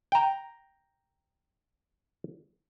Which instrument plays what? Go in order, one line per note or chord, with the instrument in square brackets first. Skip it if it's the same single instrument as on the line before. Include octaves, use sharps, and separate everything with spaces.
[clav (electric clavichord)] G5 A#5